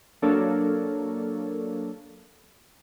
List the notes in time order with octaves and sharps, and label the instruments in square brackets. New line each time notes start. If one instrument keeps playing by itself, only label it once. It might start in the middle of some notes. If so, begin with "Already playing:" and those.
[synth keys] F#3 A#3 D4 A4 A#4 C#5